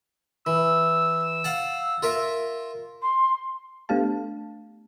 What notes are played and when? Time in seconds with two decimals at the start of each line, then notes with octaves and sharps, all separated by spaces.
0.47 E3 E6
1.44 F5 F#5 A5
2.03 F4 A#4 E5
3.02 C6
3.89 A3 B3 D4 G4 F5 A5